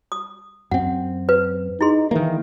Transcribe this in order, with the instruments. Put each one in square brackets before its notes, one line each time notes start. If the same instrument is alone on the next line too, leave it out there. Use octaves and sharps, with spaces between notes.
[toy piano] D#6
[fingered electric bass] F#2 C4 [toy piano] F#5
[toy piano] B4
[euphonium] D#4 [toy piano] E4 G#4 C6
[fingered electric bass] D#3 A#3 [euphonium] E3